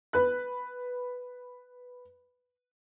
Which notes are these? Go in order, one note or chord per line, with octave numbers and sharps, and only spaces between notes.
B4 F#6